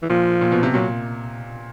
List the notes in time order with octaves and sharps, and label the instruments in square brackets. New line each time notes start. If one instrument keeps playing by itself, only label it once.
[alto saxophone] E3
[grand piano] A#2 [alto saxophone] F3
[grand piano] A#2
B2
C3
[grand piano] A#2 [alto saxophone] F#3